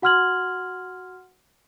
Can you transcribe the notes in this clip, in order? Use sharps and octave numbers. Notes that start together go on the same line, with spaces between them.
F#4 F#5 C6 F6 G#6 F#7